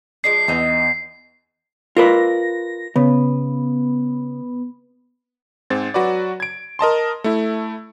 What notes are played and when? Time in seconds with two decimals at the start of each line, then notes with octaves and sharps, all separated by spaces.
0.24 F3 G#3 D4 C7
0.48 E2 B3 D#4 E5
1.97 F4 A#4 B4 A#6
2.96 C#3 B3
5.70 G#2 C4 A6
5.94 F#3 F#4 B4 D5
6.40 G#6 D7
6.79 A#4 D#5 A5 C6
7.24 A3 E4